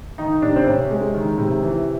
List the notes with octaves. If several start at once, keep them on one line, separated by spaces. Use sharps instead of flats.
D#3 D#4
C3 D4
C4
C3 C#4
G#3
D#3
C3
E3